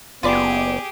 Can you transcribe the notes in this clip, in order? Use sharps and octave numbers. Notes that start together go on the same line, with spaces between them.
F#1 B3 F4 G4 G#4 B4 D5